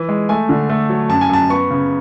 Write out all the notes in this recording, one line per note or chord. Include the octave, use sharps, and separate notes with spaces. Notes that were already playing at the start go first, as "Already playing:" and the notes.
Already playing: E3
G#3
A3 G#5
D3
A3
F#3
F#2 A5
G#5
F#2 A5
B3 C#6
C#3